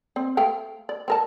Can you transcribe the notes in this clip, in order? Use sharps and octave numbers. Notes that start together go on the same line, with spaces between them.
C4
A3 F5 G5
D5
C4 A#4 A5